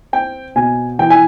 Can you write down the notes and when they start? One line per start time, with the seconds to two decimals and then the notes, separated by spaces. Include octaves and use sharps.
0.13 C4 G5
0.56 B2 G#5
0.99 E3 G5
1.10 G#5